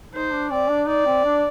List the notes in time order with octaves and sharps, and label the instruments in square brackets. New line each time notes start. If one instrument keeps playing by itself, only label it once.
[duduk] D#4 [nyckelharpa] C5
[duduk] D4
[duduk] C4 [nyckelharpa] D5
[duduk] D4
[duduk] D#4 [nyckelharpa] D5
[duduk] C4
D4